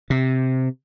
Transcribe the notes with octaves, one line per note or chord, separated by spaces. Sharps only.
C3